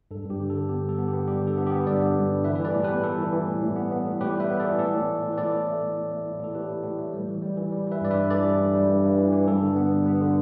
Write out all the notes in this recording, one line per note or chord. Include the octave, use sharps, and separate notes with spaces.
G2 A4
G2
G4
D3
A4
D3
B3 G4
G3
A4
B3
G4
B3
G3 G4
D3 A4
B3
G4 B4
B3
G2 A4 D5
B3
G2
G3
E3 B4 E5
E3 B4
A4 D5
A2
G4 B4
B3
G3 A4
E3
E3
A2
A2
B3
B3
A2
A2 G4 B4
G3
B4 E5
B3
A4 D5
E3
A2 A4 D5
A2
A3
A2
B4
A2 A4 D5
A2
A3
A2
A2
A3
A2
A2 A4
A2 G4 B4
A2
A2
A3
G3
E3
G3
E3
G3
E3
B4 E5
G2 D5
B4 E5
G2
E3 A4 D5
G3
G2
G3
G2
G2
E3
E3
G2 A4
D3
B3
G3
B3
D3